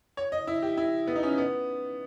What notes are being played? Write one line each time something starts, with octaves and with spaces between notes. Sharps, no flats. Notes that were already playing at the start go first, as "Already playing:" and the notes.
C#5
D#5
E4
G4
E4
B3
D#4
C#4
B3